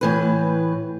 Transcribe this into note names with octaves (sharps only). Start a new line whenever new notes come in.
A2 E3 B4